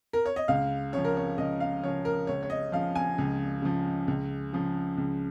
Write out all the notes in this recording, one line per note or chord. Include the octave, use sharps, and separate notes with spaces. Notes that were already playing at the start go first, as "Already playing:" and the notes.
A#4
C#5
D#5
C#2 F5
C#3 F3 C#5
A#4
C#5
C#2 D#5
F5
C#3 F3 C#5
A#4
C#2 C#5
C#5
D#5
C#3 F3 F5
G#5
C#2
C#3 F3
C#2
C#3 F3
C#2